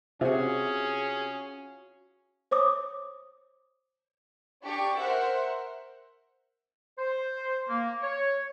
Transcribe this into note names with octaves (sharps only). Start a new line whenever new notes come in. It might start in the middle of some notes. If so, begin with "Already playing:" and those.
C3 C#4 F4 F#4 G#4
C5 C#5 D6 D#6
D4 G4 C#6
A#4 C5 E5 F#5
C5
A#3
C#5